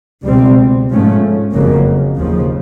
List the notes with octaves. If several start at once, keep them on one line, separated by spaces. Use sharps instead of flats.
C#2 B2 G3 C4
G#2 F3 A3 C#4
F#1 F2 C#3 F#3 A#3
D#2 C#3 F3